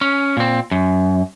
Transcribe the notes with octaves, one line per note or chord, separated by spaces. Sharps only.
C#4
A#2 C4
F#2